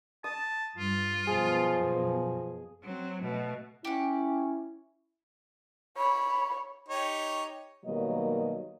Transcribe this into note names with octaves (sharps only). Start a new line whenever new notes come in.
A5 D#6
G2 F4
F#2 B2 F3 F#3 G#4
F#3 C4
B2 A3
C#4 E4 G4 F#5
C#5 B5
D#4 G4 C#5
B2 D#3 F#3 G3 A#3 D#5